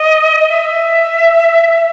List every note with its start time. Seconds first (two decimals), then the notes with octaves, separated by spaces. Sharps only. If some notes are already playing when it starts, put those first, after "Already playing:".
Already playing: D#5
0.40 D#5
0.49 E5